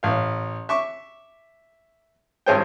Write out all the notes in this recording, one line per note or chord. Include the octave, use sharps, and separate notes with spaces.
A1 F5
E5 C#6 D6
G#1 G2 G#4 C5 C#5 G5